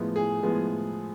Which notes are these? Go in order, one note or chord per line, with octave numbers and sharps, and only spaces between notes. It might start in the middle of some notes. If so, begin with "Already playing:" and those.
Already playing: A2 F3 G#3 B3
G#4
A2 F3 G#3 B3